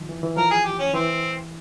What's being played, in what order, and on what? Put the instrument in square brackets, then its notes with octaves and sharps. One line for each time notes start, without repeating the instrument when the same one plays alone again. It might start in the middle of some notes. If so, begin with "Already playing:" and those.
Already playing: [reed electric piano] D#3 F3
E3
E3
[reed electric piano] F3 [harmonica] A#4
[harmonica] G#4
G4
C#4
[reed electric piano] E3 [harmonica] C4